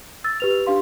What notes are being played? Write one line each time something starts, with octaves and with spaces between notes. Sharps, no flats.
E6 A6
G4 B4 F7
D4 G4 F5 C6